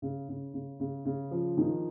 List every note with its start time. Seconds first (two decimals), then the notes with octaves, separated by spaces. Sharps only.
0.02 C#3
0.29 C#3
0.54 C#3
0.80 C#3
1.05 C#3
1.31 F3
1.57 D#3